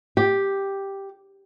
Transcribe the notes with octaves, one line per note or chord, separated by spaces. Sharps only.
G4